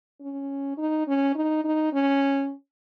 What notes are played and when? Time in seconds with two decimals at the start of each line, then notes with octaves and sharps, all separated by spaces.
0.21 C#4
0.78 D#4
1.08 C#4
1.35 D#4
1.64 D#4
1.93 C#4